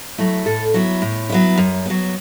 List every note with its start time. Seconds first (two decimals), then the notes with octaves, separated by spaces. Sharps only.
0.18 F#3 A3 E4
0.45 A2 A4
0.74 F#3 B3 E4
1.02 A2
1.29 F#3 B3 E4
1.58 F#2
1.86 F#3 B3